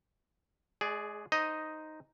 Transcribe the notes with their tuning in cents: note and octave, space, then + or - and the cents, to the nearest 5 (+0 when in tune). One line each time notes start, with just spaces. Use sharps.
G#3 +35 G#4 +0 D5 +0
D#4 +0 C5 +0 D#5 +0